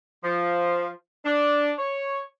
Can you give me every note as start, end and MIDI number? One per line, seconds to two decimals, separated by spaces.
0.24 0.89 53
1.25 1.72 62
1.79 2.22 73